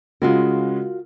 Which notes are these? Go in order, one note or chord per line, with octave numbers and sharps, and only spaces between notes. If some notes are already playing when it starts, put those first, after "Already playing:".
C#3 G#3 F4 F#4 A#4